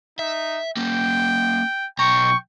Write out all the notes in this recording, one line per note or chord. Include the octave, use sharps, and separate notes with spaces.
D#4 E5
A#3 C#4 G5
B1 G5 A#5 C#6